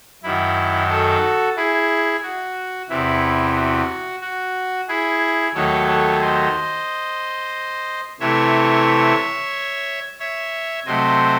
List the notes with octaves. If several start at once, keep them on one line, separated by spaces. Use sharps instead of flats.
F#2 D#3 F#3 E4
F#4 A4
E4 G#4
F#4
E2 C3 E3 E4
F#4
F#4
E4 G#4
D#2 D#3 F#3 A3 A4 C#5
A4 C#5
C5 D#5
C3 E3 A3 C#5 E5
C#5 E5
C3 F#3 A3 C5 D#5